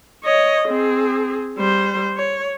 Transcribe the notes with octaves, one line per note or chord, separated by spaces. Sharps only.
C#5 D#5
C4 G#4
G3 C5
C#5